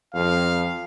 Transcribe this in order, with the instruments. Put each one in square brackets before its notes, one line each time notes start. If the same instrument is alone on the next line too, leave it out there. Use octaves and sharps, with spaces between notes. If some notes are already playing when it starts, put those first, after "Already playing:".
[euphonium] F2 [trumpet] F5